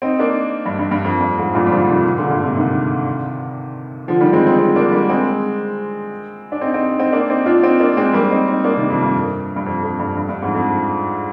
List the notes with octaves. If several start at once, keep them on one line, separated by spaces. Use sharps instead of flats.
C4 D#4
A#3 D4
G2
G2
G2
F2
G2
F2 G#2
G2 A#2
G3
D3 F3
C3 D#3
A#2 D3
G#2
G2 A#2
G#2 C3
C3 D#3
D3 F3
D#3 G3
G#3 C4
C4 D#4
C4 D#4
A#3 D4
G3 A#3
G#3 C4
D4
C4 D#4
C4 D#4
C4 D#4
A#3 D4
C4 D#4
D4 F4
C4 D#4
A#3 D4
G#3 C4
G3 A#3
C4 D#4
C4 D#4
A#3 D4
C3 D#3
F2
G2
G2
F2
F2
G2
G2
G2
F2 G#2
F2